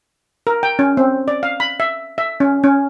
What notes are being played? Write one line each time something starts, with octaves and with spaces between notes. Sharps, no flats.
A#4
G5
C#4
C4
D5
F5
B5
E5
E5
C#4
C#4